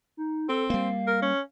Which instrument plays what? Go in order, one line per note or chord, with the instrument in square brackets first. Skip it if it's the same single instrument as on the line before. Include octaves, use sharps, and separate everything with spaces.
[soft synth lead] D#4
[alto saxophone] C4 [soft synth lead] A4
[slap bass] G3 A#3 [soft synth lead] F5
[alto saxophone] A#4
C#4